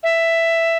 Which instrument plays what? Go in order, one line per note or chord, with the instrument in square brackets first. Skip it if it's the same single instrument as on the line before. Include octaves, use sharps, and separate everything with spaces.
[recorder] E5